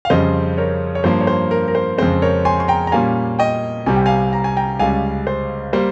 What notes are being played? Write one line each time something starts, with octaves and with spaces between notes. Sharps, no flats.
F5
F2 C#3 G3 C5 D#5
A#4 C#5
C#5
G2 F3 A#3 C5
C#5
C5
A#4
A#4
C5
F2 C#3 G#3 C4 C5
A#4 C#5
G#5 C6
C6
G5 A#5
A#5
A#2 G3 A#3 C#4 F5 G#5
D#5 G5
C2 C3 G3 G#5
G5
F5 G#5
A#5
G#5
G5 A#5
C#2 C#3 G3 F5 G#5
C5
G3 A#3 C5